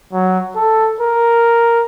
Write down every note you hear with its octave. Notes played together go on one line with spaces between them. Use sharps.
F#3
A4
A#4